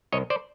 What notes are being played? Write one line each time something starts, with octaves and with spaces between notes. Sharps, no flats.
C2 C#5 D#5
C5 D5